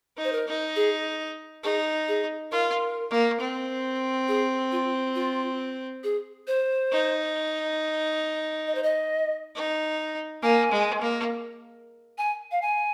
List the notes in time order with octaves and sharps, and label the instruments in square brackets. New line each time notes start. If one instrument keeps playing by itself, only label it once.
[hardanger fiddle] D#4
[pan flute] C5
A#4
[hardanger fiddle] D#4
[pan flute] G#4
[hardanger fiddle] D#4 [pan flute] G#4
[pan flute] G#4
[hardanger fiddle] F4 [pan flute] A#4
[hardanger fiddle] A#3
C4
[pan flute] G#4
F4
F4
G#4
C5
[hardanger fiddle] D#4
[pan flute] D#5
C5
D#5
[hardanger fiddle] D#4
[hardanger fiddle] A#3 [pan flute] G#5
[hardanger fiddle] G#3
A#3
[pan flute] G#5
F5
G#5